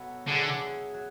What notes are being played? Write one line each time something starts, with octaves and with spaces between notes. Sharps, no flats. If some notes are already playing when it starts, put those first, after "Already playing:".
Already playing: B2 F#3 B3 F#4 A4 E5
D3 F#3 B3 E4 G#4 C#5
F#3